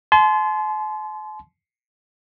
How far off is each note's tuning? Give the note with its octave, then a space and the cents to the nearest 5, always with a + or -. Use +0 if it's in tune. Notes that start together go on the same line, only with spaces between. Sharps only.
A5 -45 C6 -15